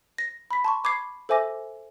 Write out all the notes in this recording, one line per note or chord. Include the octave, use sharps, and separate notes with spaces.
A#6
B5 B6
A5 C6 C#6
B5 D6 G#6 C7
A4 C5 E5 G#5 D6 A#6